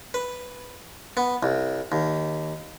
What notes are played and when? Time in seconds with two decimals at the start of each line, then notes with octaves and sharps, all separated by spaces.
0.14 B4
1.17 B3
1.43 C2
1.92 D#2